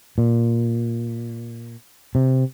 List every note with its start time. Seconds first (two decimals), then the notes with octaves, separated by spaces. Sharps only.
0.18 A#2
2.15 C3